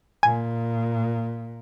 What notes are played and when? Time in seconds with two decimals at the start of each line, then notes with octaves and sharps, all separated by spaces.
0.23 A#2 G#5